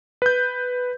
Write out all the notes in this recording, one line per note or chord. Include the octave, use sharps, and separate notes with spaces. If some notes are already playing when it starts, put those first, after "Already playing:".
B4 G6